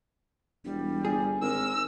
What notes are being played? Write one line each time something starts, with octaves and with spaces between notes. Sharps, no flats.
E1 G3
G1 G#4
G#1 A#4 E6